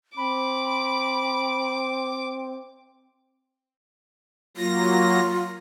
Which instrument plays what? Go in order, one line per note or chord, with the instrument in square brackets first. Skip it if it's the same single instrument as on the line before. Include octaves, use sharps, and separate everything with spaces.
[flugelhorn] C4 [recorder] B5 [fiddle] D6
[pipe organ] F#3 A#3 A#6 [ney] F4